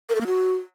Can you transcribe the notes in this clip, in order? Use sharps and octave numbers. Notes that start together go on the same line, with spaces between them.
A#4
A4
A#3
F#4